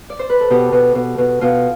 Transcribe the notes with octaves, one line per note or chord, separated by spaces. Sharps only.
D5
C5
B4
A4
B2 G4
B2
B2
B2
B2 F4